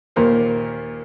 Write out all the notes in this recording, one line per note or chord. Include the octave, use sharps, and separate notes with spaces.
D#2 A#2 A#3 A#4 C5